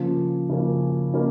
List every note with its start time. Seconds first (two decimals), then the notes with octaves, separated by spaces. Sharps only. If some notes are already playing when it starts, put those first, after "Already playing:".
Already playing: C#3 F3 A#3 C#4
0.49 C#3 F3 A#3 C#4
1.14 A#3 C#4